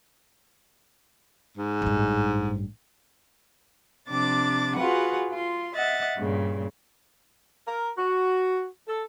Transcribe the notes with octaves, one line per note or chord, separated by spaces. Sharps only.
G#2
A1 G2
C3 F3 D4 D6 A6
F4 F#4 G#4 B4 F#5
F4 C6
D#5 E5 F#5 A6
G2 A#2 C#3
A#4
F#4
A4